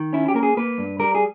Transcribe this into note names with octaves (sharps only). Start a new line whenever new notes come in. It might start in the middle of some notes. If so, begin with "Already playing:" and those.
Already playing: D#3
C#4 E4
G4
A#3 A#4
G#4
A#3 B4
G2
G3 A#4
G#4